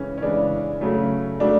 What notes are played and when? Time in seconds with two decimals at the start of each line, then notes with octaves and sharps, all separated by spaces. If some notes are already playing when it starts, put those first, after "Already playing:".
Already playing: C#3 E3 G#3 C#4
0.18 C#4
0.22 C#3 E3 G#3 D4
0.81 C#3 F#3 A3
1.40 C#3 F#3 A3 D4